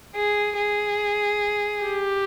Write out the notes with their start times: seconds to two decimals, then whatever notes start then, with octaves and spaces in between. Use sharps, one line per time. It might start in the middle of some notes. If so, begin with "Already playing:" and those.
0.15 G#4
0.57 G#4
1.83 G4